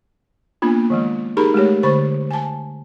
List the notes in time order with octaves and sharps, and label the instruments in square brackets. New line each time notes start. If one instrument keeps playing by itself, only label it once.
[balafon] A#3 B3 D4 F4
D#3 F3 G#3
D#4 G4 G#4 A#4 A#5 B5
G#3 A3 G4 C#5
D3 C5 C#6
G#5 A5